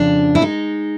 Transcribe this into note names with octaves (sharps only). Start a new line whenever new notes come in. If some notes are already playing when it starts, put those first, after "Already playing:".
Already playing: F2 C#3 F3 D4
E4
G#3 D#4